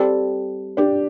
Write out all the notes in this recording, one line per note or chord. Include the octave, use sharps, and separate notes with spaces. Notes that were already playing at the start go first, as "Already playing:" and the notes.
Already playing: G3 C4 A4
D4 G4